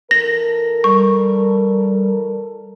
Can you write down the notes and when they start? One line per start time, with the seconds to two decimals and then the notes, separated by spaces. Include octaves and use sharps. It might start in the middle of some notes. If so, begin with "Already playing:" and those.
0.11 E3 A4 A#4 A#6
0.84 G3 C#6